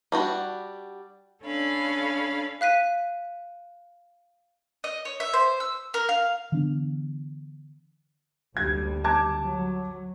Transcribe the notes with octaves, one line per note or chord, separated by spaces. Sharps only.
G3 D4 F#4
C#4 D4 A4 F5 B5
F5 F#6 B6 D#7
D#5
C#5
E5
C5
E6
A#4
F5
D3 E3 B3 D4
F#1 D2 G3 G#6
A5 D6 G#6
F#3